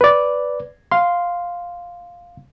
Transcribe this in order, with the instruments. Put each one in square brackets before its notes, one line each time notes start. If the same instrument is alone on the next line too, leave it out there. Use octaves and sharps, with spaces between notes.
[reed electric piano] B4 D5
F5 C6